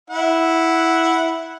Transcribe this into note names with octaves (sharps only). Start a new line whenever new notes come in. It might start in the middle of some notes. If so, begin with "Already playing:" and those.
E4 F#5